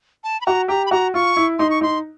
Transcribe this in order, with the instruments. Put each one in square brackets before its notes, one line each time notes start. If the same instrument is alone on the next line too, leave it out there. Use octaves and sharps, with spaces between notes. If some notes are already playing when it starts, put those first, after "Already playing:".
[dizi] A5
B5
[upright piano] F#4 [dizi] A#5
[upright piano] G4 [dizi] A#5
[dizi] B5
[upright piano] F#4 [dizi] A#5
[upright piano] F4 [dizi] C#6
[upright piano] E4
[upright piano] D#4 [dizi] C6
[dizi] C#6
[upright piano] D#4 [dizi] C6